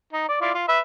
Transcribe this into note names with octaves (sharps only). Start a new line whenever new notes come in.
D#4
D5
E4 F4 D5
F4
B4 E5